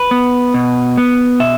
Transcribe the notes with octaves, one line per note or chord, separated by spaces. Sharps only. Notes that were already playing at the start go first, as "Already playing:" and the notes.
Already playing: B4
B3
B2
B3
B2 E5